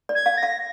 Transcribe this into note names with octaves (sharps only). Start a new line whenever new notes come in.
D5
G#6
F5
A#6
F5